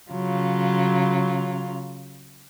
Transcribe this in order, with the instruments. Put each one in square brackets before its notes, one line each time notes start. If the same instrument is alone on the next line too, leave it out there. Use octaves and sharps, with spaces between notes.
[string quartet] C#3 F#3 F4